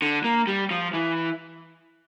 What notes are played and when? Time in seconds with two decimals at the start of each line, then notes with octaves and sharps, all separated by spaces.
0.02 D3
0.24 A#3
0.47 G3
0.71 F3
0.94 E3